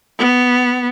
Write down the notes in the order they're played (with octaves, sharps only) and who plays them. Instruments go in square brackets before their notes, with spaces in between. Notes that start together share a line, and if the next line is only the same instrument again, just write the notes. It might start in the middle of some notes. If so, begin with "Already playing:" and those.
[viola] B3